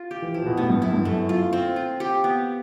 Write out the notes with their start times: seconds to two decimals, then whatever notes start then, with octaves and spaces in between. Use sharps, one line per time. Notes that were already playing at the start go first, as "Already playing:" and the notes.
Already playing: F4
0.11 G4
0.22 E3
0.34 F3 E4
0.42 A#2
0.46 B2
0.57 A2 B3
0.70 G2
0.81 F#2 E4
0.94 G2
1.05 F#2 A3
1.29 F4
1.53 C4
1.76 F4
2.00 G4
2.24 B3